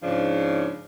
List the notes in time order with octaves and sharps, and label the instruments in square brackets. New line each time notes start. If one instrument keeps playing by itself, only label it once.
[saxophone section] G#2 C#3 F3 D4